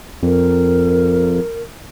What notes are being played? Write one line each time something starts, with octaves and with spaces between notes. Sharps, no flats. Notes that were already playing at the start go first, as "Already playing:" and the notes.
F2 A#4